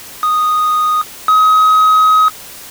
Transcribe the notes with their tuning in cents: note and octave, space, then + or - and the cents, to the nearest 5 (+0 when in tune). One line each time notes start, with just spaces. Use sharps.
D#6 -5
D#6 +30